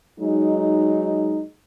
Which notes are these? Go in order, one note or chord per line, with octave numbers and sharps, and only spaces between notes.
F#3 G#3 D#4